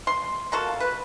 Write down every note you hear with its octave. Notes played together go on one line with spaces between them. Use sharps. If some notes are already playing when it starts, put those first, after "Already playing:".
C6
A#3 F4 F#4 A4
B4